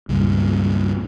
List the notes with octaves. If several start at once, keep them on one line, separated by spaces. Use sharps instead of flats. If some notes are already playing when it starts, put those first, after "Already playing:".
C#2 G2 A#2